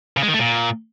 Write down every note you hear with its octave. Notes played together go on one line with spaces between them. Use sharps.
C#3
G#3
D#3
A3
A#2